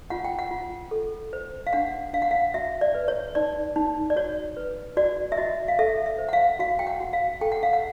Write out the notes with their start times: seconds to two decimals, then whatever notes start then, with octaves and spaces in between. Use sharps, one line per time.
0.10 F4 F#5
0.25 G5
0.39 F#5
0.51 F4
0.91 A4
1.33 C5
1.67 F5
1.73 D4 F#5
2.13 D4 F5
2.22 F#5
2.31 F5
2.54 F#4 E5
2.81 D5
2.95 B4
3.08 C#5
3.35 D#4 D5
3.76 D#4
4.10 D5
4.16 F#4 C#5
4.57 B4
4.97 F#4 D5
5.32 E5
5.37 F#4 D#5
5.68 F5
5.79 A4 E5
6.06 E5
6.19 C5
6.29 F#5
6.33 F5
6.59 F#4 F5
6.79 G5
6.87 F#5
7.00 F#4
7.13 F5
7.41 A4 G5
7.52 F#5
7.63 F5
7.73 F#5